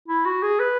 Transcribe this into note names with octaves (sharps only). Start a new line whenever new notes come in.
E4
F#4
G#4
B4